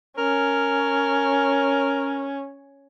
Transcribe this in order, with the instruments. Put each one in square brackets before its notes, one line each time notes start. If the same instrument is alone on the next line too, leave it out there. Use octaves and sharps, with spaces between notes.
[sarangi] C#4 [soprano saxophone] A#4